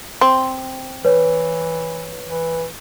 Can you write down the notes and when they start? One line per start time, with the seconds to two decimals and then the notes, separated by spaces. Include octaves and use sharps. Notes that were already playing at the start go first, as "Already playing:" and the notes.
0.21 C4
1.05 E3 B4 C#5
2.26 E3